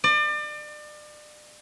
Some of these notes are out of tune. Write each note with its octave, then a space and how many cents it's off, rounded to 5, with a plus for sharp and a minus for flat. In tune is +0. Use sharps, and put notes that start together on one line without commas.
D5 +35